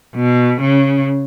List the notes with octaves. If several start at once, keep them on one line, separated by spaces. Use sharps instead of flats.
B2
C#3